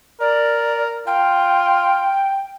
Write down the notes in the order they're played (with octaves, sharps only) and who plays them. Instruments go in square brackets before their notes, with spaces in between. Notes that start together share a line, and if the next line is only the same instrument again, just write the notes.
[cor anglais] A#4 [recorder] D5
[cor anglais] F4 [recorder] G5